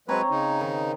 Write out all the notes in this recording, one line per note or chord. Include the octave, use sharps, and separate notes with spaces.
F#3 G#3 C4 B4 C#5 A#5
C#3 D#4
D#3